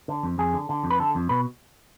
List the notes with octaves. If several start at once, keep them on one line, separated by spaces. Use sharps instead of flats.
D3
F2
F2 G#4
D3
D3
F2
B4
D3 A4
F2
B2 B4